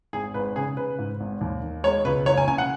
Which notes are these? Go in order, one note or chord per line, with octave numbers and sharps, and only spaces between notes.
G#1 G#4
G#1 B4
C#3 G#4
C#3 B4
G#2
G#1
D#2
D#3
G#3 C#5
C#2 B4
F#1 C#5
G#5
C#3 G#5
F#5